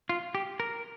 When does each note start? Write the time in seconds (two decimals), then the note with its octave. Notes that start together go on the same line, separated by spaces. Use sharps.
0.09 F4
0.35 G4
0.60 A#4